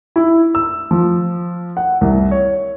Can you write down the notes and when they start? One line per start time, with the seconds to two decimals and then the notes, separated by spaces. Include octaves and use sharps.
0.16 E4
0.55 E6
0.91 F3
1.77 F#5
2.01 C2
2.31 C#5